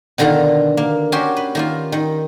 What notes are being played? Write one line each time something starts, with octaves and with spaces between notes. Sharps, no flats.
B2 D3 D#3 F4 A#5
A#3
C#4 F#4 G4 A#4 C6
B4
D#3 A#3 F4
D#3